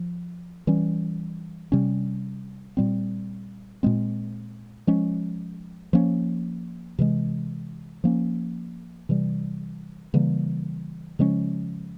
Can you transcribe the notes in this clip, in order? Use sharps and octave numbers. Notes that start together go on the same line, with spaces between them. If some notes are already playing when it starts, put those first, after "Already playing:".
Already playing: F3
E3 G3 C#4
C3 G3 C#4
A#2 G3 C4
A#2 G#3 C4
F3 G#3 C#4
F3 A#3 C#4
C3 E3 G#3
F3 A#3 C#4
C3 E3 G3
C#3 E3 G3 A#3
C#3 F3 G#3 C#4